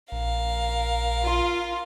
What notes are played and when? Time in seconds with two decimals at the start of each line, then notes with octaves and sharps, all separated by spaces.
0.12 A#1 A#4 F5
1.24 F4